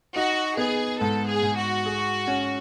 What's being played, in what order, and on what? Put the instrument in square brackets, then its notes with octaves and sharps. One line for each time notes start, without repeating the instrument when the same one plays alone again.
[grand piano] D#4 [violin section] F#4
[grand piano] B3 [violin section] G#4
[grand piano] G#2 [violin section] A4
[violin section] G#4
[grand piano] G#2
[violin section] F#4
[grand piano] G#4
C#4